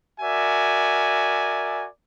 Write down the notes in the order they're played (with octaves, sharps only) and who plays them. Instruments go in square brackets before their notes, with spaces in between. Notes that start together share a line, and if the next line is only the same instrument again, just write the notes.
[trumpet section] F#4 A#4 D5 E5 G#5